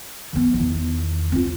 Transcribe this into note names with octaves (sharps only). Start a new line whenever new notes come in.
D#3 B3
E2 D#3
C4 F4